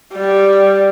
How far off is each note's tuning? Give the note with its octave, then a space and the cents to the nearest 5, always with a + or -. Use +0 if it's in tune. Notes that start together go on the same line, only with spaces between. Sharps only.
G3 +0